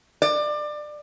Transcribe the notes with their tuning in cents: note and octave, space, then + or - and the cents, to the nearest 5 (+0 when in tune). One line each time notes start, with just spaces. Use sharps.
D5 +25